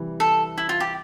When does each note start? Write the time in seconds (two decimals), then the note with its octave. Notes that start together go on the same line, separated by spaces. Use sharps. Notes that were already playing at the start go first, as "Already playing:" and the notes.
Already playing: C3 E3 G3
0.20 A4
0.58 E4
0.69 F4
0.80 G4